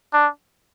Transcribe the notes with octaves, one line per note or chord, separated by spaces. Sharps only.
D4